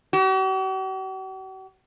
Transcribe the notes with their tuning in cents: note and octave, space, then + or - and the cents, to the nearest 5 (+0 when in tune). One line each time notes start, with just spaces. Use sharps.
F#4 +45